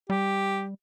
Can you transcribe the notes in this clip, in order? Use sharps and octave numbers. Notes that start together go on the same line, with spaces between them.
G3 G4